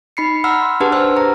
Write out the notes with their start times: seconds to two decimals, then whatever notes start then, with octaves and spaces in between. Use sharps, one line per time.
0.17 D#4 B5 C7 C#7
0.44 F#5 A#5 B5 E6 F6
0.62 C6
0.80 D4 G4 G#4 B4 F#5 A5
0.92 C5 E6 F6
1.16 G#4 A#5